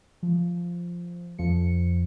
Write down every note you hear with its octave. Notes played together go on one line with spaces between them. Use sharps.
F3
F2 F3 C#7